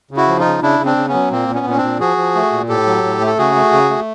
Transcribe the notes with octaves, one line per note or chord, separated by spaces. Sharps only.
C#3
E4 F#4
F3
D#4 F4
C#3
C#3 D4 E4
C#3
C4 D4
C#3
B3 C#4
F#3
A#2 A#3 C4
A#2
B3 C#4
A#2 C#4
C4 D4
A#2
F3 F#4 G#4
F3
A3
A#2
A2 G4 A4
F#3
A2
A3
A4
C#3 F#4 G#4
A3
C#3
A3